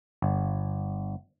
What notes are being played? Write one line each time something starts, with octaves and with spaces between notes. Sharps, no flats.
G1